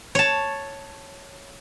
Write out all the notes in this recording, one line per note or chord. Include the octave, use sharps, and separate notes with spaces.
C#5 A5